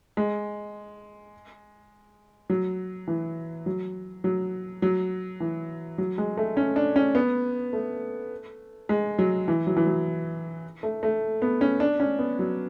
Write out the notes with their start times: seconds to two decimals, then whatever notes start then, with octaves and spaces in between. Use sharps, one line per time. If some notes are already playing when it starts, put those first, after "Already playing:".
0.17 G#3
2.50 F#3
3.08 E3
3.66 F#3
4.24 F#3
4.82 F#3
5.40 E3
5.98 F#3
6.18 G#3
6.38 A3
6.57 C#4
6.76 D4
6.96 C#4
7.15 B3
7.73 A3
8.89 G#3
9.19 F#3
9.48 E3
9.67 F#3
9.77 E3
9.86 F#3
10.83 A3
11.03 A3
11.42 B3
11.61 C#4
11.80 D4
12.00 C#4
12.19 B3
12.39 F#3